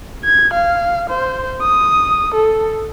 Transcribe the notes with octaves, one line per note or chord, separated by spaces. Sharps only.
G#6
F5
C5
D#6
A4